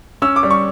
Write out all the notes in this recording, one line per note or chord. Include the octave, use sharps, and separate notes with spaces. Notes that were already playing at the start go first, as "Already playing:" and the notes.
C#4 E6
D6
G3
C#6